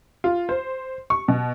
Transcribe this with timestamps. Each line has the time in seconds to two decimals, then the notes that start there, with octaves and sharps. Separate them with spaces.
0.24 F4
0.49 C5
1.10 C#6
1.28 B2